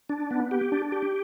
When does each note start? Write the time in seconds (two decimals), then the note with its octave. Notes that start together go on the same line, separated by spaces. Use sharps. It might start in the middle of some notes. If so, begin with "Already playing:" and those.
0.09 D4
0.31 B3
0.51 G4
0.72 D4
0.92 G4